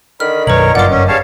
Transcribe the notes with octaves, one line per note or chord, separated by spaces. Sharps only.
D3 D#3 B5 F6
B1 F#2 A#4 B4 C#5 F#7
G1 F#2 F4 D5 F#5 D6
C#4
E2 C#3 G3 C#5 F5 A5